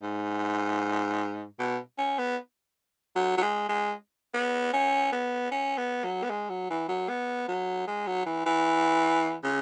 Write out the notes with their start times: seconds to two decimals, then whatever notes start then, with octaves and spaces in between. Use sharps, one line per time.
0.02 G#2
1.59 B2
1.98 C#4
2.19 B3
3.16 F#3
3.38 F#3
3.42 G#3
3.68 G#3
4.34 B3
4.73 C#4
5.12 B3
5.51 C#4
5.77 B3
6.04 F#3
6.23 B3
6.30 G#3
6.49 F#3
6.70 E3
6.88 F#3
7.09 B3
7.48 F#3
7.87 G#3
8.07 F#3
8.26 E3
8.46 E3
9.44 C#3